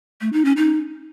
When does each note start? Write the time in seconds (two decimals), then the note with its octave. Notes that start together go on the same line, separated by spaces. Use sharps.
0.21 A3
0.33 D#4
0.45 C#4
0.57 D#4